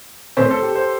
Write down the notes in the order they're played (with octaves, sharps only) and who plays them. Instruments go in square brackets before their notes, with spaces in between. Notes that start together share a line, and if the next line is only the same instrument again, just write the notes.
[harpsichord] A2 E3 A3 C4 [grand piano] C5
[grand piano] A4
G4
C5